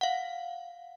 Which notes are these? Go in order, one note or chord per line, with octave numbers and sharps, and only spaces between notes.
F5 F#5